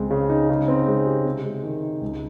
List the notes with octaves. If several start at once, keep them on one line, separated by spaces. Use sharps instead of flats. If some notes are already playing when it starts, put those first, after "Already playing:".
Already playing: C#2 G#3 C4
C#3
D#4
C#3
C4
G#3
G4
C3
G#3
D#3
D#4
C#2